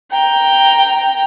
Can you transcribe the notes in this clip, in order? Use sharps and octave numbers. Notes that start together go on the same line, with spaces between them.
G5 A#5